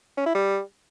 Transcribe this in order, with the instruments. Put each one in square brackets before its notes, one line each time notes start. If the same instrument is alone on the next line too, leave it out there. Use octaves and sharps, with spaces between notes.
[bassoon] C#4
E4
G3